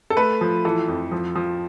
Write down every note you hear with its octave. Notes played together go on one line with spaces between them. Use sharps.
A4
A3 B4
F3
E3 A4
F2
F3
F3